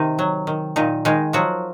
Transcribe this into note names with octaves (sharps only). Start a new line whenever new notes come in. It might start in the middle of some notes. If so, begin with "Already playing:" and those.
Already playing: C3 D#3 D#4
F#3
D#3
A#2 D#3 D#4
D#3 G#3 D#4
F3 F#3 F#4